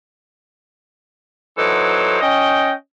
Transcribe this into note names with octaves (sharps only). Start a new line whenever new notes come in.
E3 F#3 D#4 A4 C5
C#4 D#5 G5